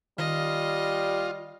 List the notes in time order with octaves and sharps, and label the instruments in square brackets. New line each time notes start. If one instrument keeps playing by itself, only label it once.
[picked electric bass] D#3 [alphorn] G3 [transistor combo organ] F4 [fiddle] D#5